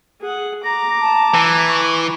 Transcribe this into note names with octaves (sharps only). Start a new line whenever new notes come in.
G#4 F#5
A#5 D6 A#6
A5
E3
C#6